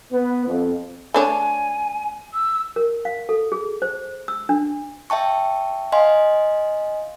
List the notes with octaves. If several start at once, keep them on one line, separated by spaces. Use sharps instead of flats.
B3
F2
A3 D4 C#5 G#5
E6
A#4
F5
A4
G#4
C5
E6
D4
E5 G5 A5 C#6
D#5 F5 G#5 C6